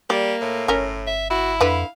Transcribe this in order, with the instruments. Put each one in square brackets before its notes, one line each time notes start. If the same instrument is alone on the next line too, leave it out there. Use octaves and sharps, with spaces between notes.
[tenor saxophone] G3 [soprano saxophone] A#3 [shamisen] D5
[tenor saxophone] A2
[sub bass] G1 [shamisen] C#4 A#4
[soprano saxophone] E5
[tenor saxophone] E4 [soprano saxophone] F#4
[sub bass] F2 [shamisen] D3 B4 [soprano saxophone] F5